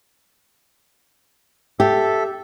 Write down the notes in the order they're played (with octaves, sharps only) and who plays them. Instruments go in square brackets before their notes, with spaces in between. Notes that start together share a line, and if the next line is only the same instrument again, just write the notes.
[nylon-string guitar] G4 [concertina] A4 E5